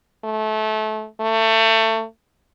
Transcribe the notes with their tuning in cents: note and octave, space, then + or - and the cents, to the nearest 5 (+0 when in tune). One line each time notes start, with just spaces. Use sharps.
A3 -25
A3 +25